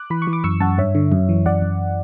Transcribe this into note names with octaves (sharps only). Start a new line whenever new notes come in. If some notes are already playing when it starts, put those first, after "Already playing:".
Already playing: D6 F#6
E3 B5
C#6
E3
D6
F#2 C#6 E6
F#2 F#5 A5
G2 C#5 E5
D3
F#2
E3
F#2 D5 F#5
F#2